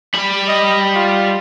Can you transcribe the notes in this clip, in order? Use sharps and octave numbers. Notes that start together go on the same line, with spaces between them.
G3 B5
D#5
F4